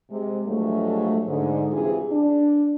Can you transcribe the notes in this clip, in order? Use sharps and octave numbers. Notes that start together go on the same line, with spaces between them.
C3 G#3
G2 F3 F#3 G#3 A3
G#2 D3
G2 C3 E3 F4 G#4
D4